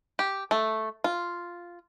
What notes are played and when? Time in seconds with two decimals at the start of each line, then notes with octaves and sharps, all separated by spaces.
0.19 G4
0.51 A3
1.04 F4